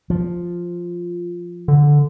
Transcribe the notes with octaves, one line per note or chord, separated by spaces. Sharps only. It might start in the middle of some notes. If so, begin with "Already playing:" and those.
F3
D3